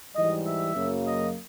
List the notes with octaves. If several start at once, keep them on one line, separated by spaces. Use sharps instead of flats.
G#2 E3 G3 D#5
E5
F#2 C#3 F#3 A#3
D#5